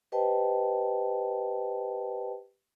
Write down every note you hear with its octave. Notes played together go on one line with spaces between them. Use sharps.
G4 B4 C5 D#5 G5 A5